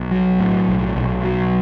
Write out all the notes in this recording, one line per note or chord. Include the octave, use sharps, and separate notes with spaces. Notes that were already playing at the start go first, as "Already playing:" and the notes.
Already playing: B1
F#3
A2
B1
B1
F#3